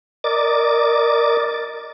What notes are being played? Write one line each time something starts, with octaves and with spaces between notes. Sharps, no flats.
A#4 D5 D#5 D6 A6